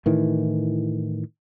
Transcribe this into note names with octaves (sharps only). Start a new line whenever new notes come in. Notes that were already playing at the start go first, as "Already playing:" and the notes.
A2 D#3 E3